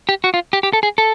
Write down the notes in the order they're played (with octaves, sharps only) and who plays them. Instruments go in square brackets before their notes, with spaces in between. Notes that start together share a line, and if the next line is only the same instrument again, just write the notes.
[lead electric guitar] G4
F#4
F4
G4
G4
A4
G#4
A4